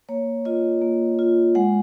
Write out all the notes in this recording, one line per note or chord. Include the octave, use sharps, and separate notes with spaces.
A#3 C#5
F4 D#5
A#3
F4
G#3 F#5